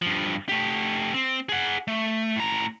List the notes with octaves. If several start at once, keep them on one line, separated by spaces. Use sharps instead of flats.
G2 F3
A3 G4
C4
G#4 F#5
A3
A2 A#5